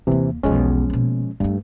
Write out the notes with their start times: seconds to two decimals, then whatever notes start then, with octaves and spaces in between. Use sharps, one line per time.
0.07 D#2 C3 E3 A#3
0.43 B1 E2 F3 G#3 C#4
0.90 B2 A#3
1.40 G2 A3 A#3